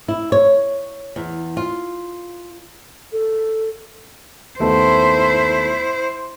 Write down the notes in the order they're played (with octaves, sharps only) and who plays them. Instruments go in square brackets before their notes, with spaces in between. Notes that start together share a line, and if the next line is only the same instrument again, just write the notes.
[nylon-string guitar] E4
C#5
E2
F4
[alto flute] A4
[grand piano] D#2 A3 B3 [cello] E4 C5